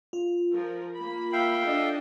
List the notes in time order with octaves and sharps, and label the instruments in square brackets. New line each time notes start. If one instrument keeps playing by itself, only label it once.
[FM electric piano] F4
[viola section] F3 A#4
A#3 B5
[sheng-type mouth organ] E5 F5 G5
[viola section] D4 A4 D#5